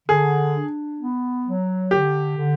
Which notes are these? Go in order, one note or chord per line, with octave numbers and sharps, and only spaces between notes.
D3 G#4
D4
B3
F#3
D3 G4
D3